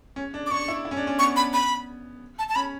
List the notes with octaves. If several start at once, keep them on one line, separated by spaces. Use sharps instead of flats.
C#4
D4
D6
D4 C#6
E4
E4
C#4
D4
C#4
B3 C#6
B5
B5
A5
A5
C#4 B5